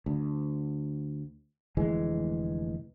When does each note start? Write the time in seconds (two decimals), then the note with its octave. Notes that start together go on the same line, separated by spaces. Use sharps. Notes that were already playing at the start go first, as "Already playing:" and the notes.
0.06 D2
1.77 F1 D2 E3 G#3